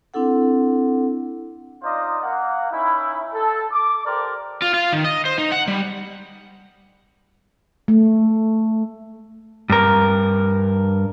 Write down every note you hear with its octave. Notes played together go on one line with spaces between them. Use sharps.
C4 D4 E4 A4 F#5
D#4 F4 C5 D5 D#5
A#3 F#5
C#4 D#4 E4
A4
D6
G4 A4 A#4 C5 D5
F4
F4
D#3
D#5
C5
D#4
F#5
G3
A3
G2 A#4